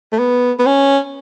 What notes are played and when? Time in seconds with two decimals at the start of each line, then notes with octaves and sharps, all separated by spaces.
0.12 A3
0.19 B3
0.59 B3
0.66 C#4